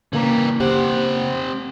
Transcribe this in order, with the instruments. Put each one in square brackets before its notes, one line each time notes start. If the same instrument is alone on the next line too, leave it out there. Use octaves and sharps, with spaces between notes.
[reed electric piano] C#3 A#3 A#5 [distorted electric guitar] E3 G3
[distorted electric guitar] C4 F#5 [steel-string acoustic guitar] G4 C5